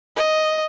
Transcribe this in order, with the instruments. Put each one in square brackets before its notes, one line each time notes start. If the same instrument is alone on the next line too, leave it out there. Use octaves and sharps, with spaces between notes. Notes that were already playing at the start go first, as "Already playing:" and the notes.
[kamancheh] D#5